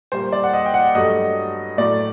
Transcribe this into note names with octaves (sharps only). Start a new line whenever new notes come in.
A#2 G3 A#3 C5
D5
F#5
D#5
G5
F#5
G2 F#3 A3 D#5
A2 F#3 A3 D5